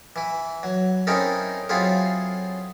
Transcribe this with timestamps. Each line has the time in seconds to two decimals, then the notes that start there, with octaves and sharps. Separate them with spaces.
0.16 E3 E4
0.63 F#3
1.07 C4 C#4 D#4 E4 A4 A#4
1.69 F#3 C4 E4 F4 G#4 A4